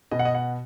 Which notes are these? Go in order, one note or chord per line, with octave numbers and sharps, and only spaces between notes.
B2 D#5
F#5
D#5
F#5